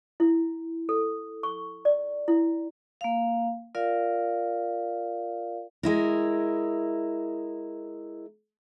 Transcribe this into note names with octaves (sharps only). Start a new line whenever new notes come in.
E4
A4
C#6
D5
E4
A#3 F5
F4 A#4 D5 F5
G#3 E4 A#4